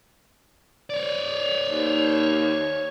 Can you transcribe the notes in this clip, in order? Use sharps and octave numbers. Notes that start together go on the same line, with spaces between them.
C#5 D5
D#2